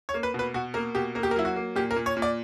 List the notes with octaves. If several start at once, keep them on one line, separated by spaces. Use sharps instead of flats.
C#5
A#3
B4
B2
B4
B2 F#4
A#3 A#4
B2 G4
A#3 A#4
G4
A#4
F#3 E4
F#4
A#3
A#2 G4
A#4
A#2
C#5
A#2
D5